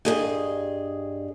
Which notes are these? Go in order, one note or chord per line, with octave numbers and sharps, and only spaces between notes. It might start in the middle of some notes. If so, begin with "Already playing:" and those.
G2 G#4 D#5